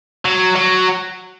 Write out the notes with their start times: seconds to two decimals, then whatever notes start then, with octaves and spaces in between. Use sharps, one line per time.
0.25 F#3
0.56 F#3